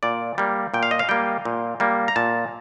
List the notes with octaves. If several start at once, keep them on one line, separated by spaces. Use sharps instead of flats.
A#2 D5
G3 A#3
A#2 G5
F5
D#5
F5
G3 A#3 G5
A#2
G3 A#3
A#5
A#2 A5